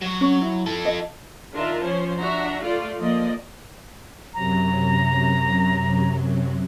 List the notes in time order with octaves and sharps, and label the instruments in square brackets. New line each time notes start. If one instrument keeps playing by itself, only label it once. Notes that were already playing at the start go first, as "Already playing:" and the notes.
[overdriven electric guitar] F#3 C#5
[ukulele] C#4
E4
[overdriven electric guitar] F3 A4
[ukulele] D#5
[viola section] D#3 D4 F4 A#4 E5 A5
F3 C#4 C5 C#5
D4 F#4 E5 A#5
A3 F4 A4 D5 F5
F3 A#3 D5 D#5
[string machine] F#2 C3 F#3 [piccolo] A#5